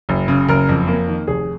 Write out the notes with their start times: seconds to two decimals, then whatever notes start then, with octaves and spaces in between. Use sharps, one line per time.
0.09 F#1
0.28 C#3
0.49 F#1 A#4
0.69 F2
0.88 A#3
1.08 D#3
1.27 F1 G#4